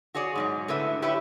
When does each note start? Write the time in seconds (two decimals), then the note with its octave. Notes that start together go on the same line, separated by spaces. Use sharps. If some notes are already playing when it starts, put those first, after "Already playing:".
0.15 F#4 G#4 C#5 D5
0.36 G#2 B2 F#3
0.68 A2 D3 B4 E5
1.02 E4 G4 B4 C#5 E5